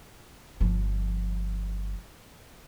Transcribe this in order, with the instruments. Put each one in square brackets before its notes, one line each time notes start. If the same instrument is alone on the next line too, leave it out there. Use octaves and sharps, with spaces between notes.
[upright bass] G1 F3